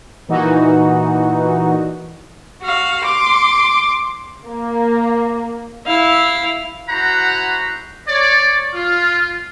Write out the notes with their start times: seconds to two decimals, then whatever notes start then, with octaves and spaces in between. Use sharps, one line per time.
0.28 A#2 E3 D#4 F#4
2.62 F#4 F5
3.05 C6 D6
4.47 A#3
5.86 E4 F5
6.89 E4 F#4 C5 F#5 A#5 B5
8.08 C#5 D5
8.74 F4